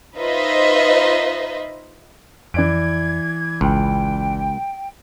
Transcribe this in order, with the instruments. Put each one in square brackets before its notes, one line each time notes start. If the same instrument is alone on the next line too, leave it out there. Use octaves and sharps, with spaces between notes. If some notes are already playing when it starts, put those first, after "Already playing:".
[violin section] D#4 F4 B4 C5 D#5 E5
[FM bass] F2 [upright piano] E3 D5 D7 [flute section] G#6
[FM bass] G#1 [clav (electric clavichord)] C#2 [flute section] G5